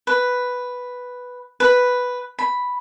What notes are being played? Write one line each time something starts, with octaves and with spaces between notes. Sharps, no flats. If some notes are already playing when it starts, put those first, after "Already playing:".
B4
B4
B5